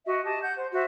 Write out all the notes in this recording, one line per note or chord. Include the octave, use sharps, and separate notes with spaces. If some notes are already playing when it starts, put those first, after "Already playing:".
F#4 D#5 E5
G4 D#5 A5
F#5 G6
C5
F#4 C5 E5